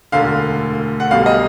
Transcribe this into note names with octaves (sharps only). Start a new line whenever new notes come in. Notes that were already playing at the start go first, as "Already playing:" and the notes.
E1 D2 D3 F5
F#5
B1 B2 G3 F5
D#5